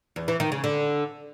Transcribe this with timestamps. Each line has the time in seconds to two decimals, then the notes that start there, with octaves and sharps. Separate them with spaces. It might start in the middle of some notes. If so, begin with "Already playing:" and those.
0.16 E2
0.28 E3
0.40 D#3
0.52 C#3
0.64 D3